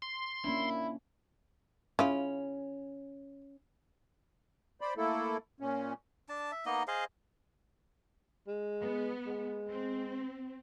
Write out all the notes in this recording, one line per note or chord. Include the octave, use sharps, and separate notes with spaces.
C6
A#3 C#4 D4 E4
C#3 C#4 E4 F4
C5 D5 B5
A3 A#3 E4 A4
A#2 C#4
D4 A5
E5
A#3 B3 D#4 D#5
G#4 C5 D#5 F5
G#3
B3
G#3
C4